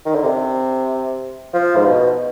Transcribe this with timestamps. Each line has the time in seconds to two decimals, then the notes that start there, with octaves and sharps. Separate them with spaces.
0.06 D#3
0.15 D3
0.23 C3
1.53 F3
1.77 G#2
1.86 B2